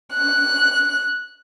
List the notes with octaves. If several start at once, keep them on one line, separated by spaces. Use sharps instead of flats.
F#6